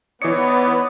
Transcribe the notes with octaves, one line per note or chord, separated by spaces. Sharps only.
E3 B3 D#4 C#5 D5 C#7